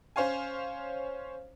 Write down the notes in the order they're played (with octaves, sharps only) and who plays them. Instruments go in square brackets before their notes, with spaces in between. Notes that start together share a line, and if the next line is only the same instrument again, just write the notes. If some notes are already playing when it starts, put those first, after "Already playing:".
[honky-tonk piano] C#4 C5 C#5 F5 G#5